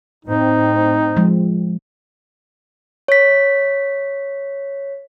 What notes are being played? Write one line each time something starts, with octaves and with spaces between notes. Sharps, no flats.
A2 C4 D#4
F3 G#3
C#5 B6